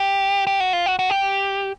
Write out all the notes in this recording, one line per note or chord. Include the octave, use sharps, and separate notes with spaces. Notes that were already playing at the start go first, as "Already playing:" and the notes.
Already playing: G4
G4
F#4
F4
F#4
F#4
G4